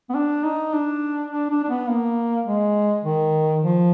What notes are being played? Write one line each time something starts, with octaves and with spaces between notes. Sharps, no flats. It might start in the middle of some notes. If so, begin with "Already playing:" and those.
B3
D4
D#4
D4
D4
D4
D4
B3
A#3
G#3
D#3
F3